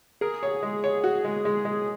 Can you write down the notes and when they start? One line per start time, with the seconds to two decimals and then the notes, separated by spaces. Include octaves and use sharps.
0.21 G#4 A#4
0.43 C#5
0.63 G#3
0.84 C#5
1.04 F#4
1.25 G#3
1.45 G#3
1.65 G#3